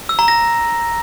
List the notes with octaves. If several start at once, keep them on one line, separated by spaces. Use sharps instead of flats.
E6
A#5
A#6